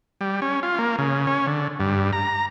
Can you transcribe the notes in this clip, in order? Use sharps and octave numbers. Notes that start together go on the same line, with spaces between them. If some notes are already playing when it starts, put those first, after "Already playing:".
G3
C#4
F4
A#3
C#3
C#4
D3
G2
A#5